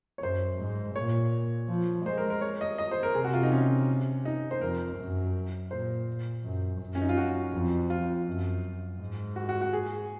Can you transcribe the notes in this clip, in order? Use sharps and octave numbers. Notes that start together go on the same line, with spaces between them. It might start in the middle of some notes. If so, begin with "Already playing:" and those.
C#5
F#2 C5
G#2
A#2 C#5
F3
G#3 C5
A#4
A#4
C#5
D#5
D#5
C5
A#4
C3 G#4
F#4
F4
D#4
C#4
D#4
C5
F2 A#4
F#2
A#2 C5
F#2
F#2
C#4
D#4
F4
F#4
F2
F4
F#2
G#2
F#4
F#4
F#4
G#4